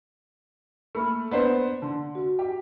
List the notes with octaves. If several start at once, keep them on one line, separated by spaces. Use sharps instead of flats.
A3 A#3 B5 F6
B3 D4 C5
D3 A5 C6
F#4
G4